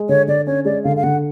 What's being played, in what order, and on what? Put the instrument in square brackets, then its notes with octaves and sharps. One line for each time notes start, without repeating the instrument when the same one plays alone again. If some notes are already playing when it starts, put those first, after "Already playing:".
Already playing: [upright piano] G#3
[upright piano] D3 [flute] C#5
[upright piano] D3 [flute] D5
[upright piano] C#4 [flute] C#5
[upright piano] G#3 [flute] D5
[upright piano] D3 [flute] F5
[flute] F5
[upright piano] D3 [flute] F#5